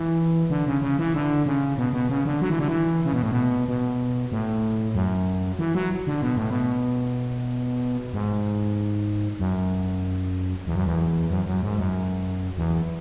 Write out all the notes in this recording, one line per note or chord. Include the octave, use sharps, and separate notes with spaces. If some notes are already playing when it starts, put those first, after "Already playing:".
Already playing: E3
D3
C#3
C#3
E3
D3
C#3
B2
B2
C#3
D3
F#3
E3
D3
E3
C#3
B2
A2
B2
B2
A2
F#2
E3
F#3
D3
B2
A2
B2
G#2
F#2
E2
F#2
E2
F#2
F#2
G#2
F#2
E2